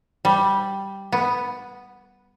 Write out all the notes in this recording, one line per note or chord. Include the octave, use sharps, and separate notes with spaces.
G3
B3